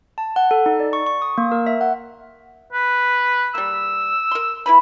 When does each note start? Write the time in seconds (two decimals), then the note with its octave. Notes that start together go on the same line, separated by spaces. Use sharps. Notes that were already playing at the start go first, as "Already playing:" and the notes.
0.18 A5
0.36 F#5
0.51 A4
0.66 D#4
0.80 D5
0.93 C#6
1.07 C#6
1.22 D#6
1.38 A#3
1.52 A#4
1.67 E5
1.81 F#5
2.73 B4
3.55 G3 A#3 E6
4.31 A#4 C6
4.66 E4 B4 B5